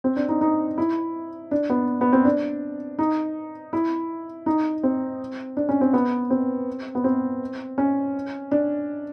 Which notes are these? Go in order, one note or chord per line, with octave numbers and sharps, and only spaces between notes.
C4
D4
D#4
D#4
E4
D4
B3
B3
C4
D4
D#4
E4
D#4
C4
D4
C#4
C4
B3
C4
B3
C4
C#4
D4